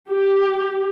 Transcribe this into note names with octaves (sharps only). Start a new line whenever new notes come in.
G4